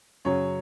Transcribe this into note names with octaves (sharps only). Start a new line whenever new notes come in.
F#2 C#3 F#3 C#5